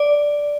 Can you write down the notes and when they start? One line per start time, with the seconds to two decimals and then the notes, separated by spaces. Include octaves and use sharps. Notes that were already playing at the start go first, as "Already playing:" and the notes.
Already playing: D5